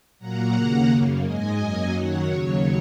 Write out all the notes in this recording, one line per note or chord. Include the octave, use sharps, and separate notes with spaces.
A#2 F#3 A#3 F#5 A#5
D#2 C#3 A#3
F#2 C#3 A#3
G#2 G#3 D#5 G#5
F#2 F#3 A#3
F#2 D#3 F#3 C#5 F#5
D#2 C#3 F#3 C#5